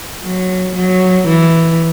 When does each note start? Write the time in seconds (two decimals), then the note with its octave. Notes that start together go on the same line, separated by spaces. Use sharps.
0.24 F#3
0.76 F#3
1.28 E3